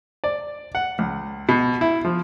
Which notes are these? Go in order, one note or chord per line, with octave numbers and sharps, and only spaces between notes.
D5
F#5
C#2
B2
E4
F3